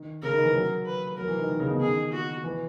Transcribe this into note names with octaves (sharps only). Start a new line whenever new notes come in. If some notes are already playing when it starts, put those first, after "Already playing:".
Already playing: D#3
C#3 A#4
D#3
E3
F#3
B4
F#3 A#4
E3
D#3
D#3
C#3
B2
D#3 G#4
F#4
E3